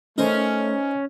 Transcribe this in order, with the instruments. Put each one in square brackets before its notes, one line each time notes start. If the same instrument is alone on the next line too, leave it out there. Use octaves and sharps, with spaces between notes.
[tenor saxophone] A3 [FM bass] C#4 [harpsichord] D#4 A#4 C5